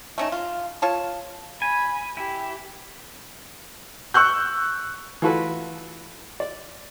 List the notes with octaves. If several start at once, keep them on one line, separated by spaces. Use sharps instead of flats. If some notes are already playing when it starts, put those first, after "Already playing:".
A3 C#4 D#4
F4
F4 C#5 A5
G#5 B5
E4 G4
C#6 E6 F#6 G6
E3 A3 F4 F#4 A4 B4
D5